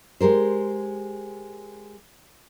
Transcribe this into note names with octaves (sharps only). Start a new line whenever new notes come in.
G#3 G4 A#4 C5